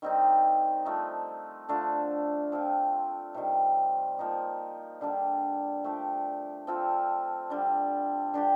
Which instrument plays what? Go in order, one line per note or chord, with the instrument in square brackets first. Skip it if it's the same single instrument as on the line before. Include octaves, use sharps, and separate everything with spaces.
[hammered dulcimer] D#3 G3 C4 D#4
F3 A3 D#4
D3 A3 D4 F4
F3 C4 F4
C3 D#3 G3
F3 A#3 D#4 G4
D3 G3 D4
F3 A3 D4 G4
F3 C4 F4 A4
D3 G3 D4
D3 G3 D4 G4